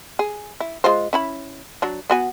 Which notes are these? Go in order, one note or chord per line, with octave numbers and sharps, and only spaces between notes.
G#4
E4
G#3 F4 C5
C#4 E4 B5
F#3 D4
B3 F#4 G#5